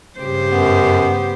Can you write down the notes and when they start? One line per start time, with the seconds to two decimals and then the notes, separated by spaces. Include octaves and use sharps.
0.19 G2 C#3 G4 C5
0.51 F#2 B3